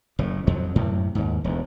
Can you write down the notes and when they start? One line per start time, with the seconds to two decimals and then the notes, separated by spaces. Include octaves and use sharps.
0.19 F#1 A2
0.47 F2 F3 F#3
0.76 F#2 A2 C3
1.15 D#2 G#2
1.44 E1 D2